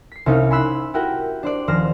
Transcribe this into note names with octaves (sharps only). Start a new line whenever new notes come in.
B6 C7
C2 C3 C#4 D#4 F5
G#5 B5 C6 E6 F#6 B6
E4 F#4 G4 A#4 F#5 G5
D4 C5 D5
D#1 F3 C5 F6 A#6